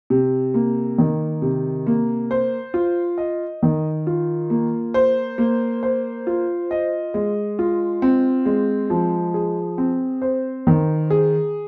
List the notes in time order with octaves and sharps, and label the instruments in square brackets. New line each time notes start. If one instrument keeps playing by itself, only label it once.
[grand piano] C3
A#3
D#3
C3
A#3
C5
F4
D#5
D#3
F4
A#3
C5
A#3
C5
F4
D#5
G#3
F4
C4
G#3
F3
G#4
C4
C5
D#3
G#4